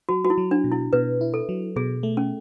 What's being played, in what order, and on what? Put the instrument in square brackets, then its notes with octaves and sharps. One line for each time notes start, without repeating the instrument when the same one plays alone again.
[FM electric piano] F#3 [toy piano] F#4
[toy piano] F#4
E4
[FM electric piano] F#3
[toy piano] D4
[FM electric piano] B2
[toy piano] E4
[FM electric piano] B2 [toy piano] B4
[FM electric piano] E4
[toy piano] A4
[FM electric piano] F#3
[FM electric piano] B2 [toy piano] G#4
[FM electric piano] A3
[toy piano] C#4